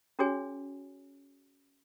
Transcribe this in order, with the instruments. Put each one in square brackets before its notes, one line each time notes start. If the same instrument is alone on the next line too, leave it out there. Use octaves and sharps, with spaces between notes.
[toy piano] C#4 F#4 G#4 C#5 G#5